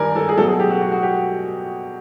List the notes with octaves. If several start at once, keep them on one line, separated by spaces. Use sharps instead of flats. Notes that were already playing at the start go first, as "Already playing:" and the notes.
Already playing: G2 D#3 G3 A#4 D5 G#5
A4
G#4
B2 F#3 A3 A4
G#4
G4
F#4
F#4
F#4
G4